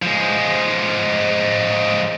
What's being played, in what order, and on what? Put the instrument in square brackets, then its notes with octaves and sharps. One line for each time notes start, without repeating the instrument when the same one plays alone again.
[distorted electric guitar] F3 G#3